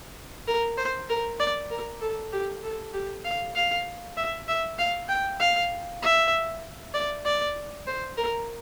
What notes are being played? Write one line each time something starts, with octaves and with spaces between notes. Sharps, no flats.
A#4
C5
A#4
D5
A#4
A4
G4
A4
G4
F5
F5
E5
E5
F5
G5
F5
E5
D5
D5
C5
A#4